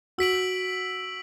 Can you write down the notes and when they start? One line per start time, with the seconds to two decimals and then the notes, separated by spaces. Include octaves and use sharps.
0.18 F#4 E6 B6 D7 F#7